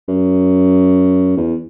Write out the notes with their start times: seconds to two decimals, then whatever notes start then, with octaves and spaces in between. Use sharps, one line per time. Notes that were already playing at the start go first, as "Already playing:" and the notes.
0.08 F#2
1.37 E2